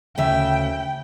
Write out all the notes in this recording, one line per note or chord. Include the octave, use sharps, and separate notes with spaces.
D2 C#3 E5 G5